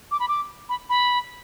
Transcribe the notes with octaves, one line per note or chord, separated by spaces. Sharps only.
D6
B5
D6
B5
B5